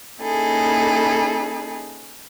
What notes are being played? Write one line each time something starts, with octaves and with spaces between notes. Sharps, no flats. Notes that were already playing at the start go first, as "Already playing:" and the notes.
A#3 C#4 D#4 E4 G#4 A4